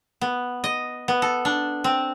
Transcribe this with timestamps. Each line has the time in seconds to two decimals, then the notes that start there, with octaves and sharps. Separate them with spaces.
0.21 B3
0.64 D#5
1.08 B3
1.22 A4
1.45 D4
1.84 C4